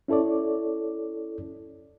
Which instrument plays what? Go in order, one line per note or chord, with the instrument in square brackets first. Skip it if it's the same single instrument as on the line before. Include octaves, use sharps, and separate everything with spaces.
[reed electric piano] C#4 E4 A4 C#5 D5